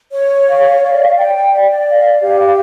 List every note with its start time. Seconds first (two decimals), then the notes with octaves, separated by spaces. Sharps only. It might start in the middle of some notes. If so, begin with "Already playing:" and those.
0.13 C#5
0.48 F5
0.83 D5
1.18 G5
1.52 D5
1.88 F5
2.22 G4